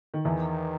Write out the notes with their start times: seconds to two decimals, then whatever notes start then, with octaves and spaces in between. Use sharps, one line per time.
0.14 D#3
0.25 E2 D#3 E3